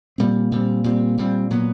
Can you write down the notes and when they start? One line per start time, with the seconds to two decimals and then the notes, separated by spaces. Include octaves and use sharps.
0.18 A#2 G3 C4
0.52 A#2 G3 C4
0.84 A#2 G3 C4
1.18 A#2 G3 C4
1.51 A#2 F#3 B3